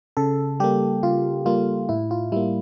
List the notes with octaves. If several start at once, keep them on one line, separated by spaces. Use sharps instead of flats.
C#3 A4
G3 A#3 G4
C#3 F4
G3 A#3 F4
A2 E4
F4
G3 A#3 E4